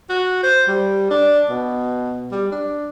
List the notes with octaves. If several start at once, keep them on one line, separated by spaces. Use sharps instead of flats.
F#4
C5
G3
D4
B2
G3
D4